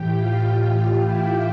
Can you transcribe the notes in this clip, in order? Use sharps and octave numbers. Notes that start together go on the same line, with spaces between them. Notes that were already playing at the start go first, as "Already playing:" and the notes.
Already playing: A2 E3 G4 G5
F4 F5
F4 F5
F4 F5
E4 E5